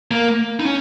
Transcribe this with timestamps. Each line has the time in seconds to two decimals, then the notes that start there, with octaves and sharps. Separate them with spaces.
0.11 A#3
0.60 D#4
0.66 C#4